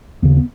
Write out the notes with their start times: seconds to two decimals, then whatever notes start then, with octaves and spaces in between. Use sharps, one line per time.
0.22 D#2 C#3 B3
0.37 B3